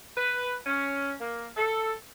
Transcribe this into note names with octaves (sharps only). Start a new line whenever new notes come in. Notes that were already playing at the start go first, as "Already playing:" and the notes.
B4
C#4
A#3
A4